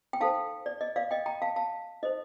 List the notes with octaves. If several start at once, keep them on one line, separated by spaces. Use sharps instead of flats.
G5
D#4 A4 C5 F5 A5
D5
D#5
D5 F5
D#5 G5
G5 A#5
F5 A5
F5 A5
D#4 A4 C5 D#5